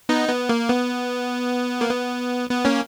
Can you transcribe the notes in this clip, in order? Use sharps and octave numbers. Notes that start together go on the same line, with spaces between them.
B3 D#4
B3
A#3
B3
A#3
B3
B3
A#3 C#4